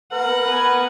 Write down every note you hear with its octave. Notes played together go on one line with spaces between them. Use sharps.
A#4 B4 F#5
B3 B4 G#5